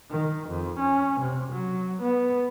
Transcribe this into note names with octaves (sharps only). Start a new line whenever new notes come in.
D#3
F2
C#4
C3
F#3
B3